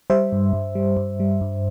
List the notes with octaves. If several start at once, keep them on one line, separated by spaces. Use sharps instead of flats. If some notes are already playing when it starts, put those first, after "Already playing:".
G3 C5 E5
G2
G2
G3
G2
G3
G2